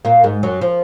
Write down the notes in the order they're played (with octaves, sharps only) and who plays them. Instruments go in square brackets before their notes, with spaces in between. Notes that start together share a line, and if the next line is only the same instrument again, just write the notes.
[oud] A#2 A#3
G#2 G#3
F#2 F#3
F3